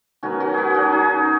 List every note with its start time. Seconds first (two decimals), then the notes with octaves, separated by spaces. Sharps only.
0.23 D#3 F#3 B3 C#4 F#4
0.40 C#4 F#4
0.54 F#4 G#4 B4
0.74 C#4 F#4
0.92 D#4 G#4